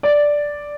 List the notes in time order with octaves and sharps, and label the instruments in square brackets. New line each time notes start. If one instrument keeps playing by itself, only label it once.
[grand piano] D5